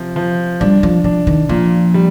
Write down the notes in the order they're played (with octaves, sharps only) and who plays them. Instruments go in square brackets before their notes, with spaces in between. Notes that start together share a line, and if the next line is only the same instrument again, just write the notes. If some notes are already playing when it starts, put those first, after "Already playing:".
Already playing: [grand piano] C3 F3
F3
[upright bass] G3 [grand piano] D4
[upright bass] F3
[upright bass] F3 [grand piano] D4
[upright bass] D#3
[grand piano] A#2 [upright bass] F3
[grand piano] G3